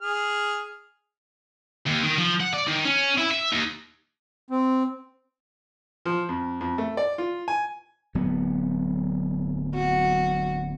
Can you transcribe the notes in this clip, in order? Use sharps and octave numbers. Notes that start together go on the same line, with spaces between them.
G#4 F6
D#2
D#3
F3
F#5
D5
D#3
C#4
E4
E5
D#2
C4
F3
F2
F2
A3
D5
F4
G#5
D1 F#3 B3
F#4